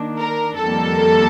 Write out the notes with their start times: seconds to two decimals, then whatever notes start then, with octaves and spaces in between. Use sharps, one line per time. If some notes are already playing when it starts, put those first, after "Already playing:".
Already playing: D#3 A#3 D4
0.18 A#4
0.57 F2 D#3 G3 A#3 A4